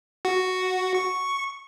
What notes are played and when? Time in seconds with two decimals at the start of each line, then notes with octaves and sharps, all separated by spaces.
0.25 F#4
0.95 C#6